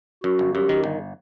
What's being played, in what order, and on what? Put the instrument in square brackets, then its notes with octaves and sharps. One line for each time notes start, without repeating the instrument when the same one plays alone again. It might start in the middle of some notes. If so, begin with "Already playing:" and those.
[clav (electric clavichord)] F#2 [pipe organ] F#4
[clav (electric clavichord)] G1
[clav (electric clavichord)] F#2 [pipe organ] G4
[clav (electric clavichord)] D#3
G1